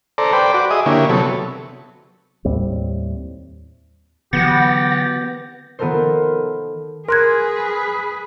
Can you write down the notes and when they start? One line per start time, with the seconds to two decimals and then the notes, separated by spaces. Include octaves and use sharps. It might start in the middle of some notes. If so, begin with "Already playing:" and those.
0.18 A4 C5 D5 A#5
0.33 B4 C5 D5 G5
0.54 F#4 D6
0.71 G#4 D#5 E5 D#6
0.86 D3 A#3 E4 G4 C#5
1.09 C3 F#3 B3 A4 C#5
2.45 D#2 A2 G3 C4
4.33 D3 E3 F#3 B3 G4 F#5 A6 A#6
5.79 D#3 B3 F4 A4 A#4 C5
7.08 G#4 A#4 B4 C6 F#6 G#6